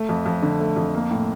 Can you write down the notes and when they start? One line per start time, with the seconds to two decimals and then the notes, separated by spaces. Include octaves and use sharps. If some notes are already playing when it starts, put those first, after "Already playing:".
Already playing: A3
0.09 F2
0.26 F2
0.42 D3
0.60 A3
0.76 F2
0.95 A#3
1.11 A2